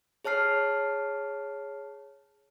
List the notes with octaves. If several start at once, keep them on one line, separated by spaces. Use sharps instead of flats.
G#4 C#5 A5 F6 C7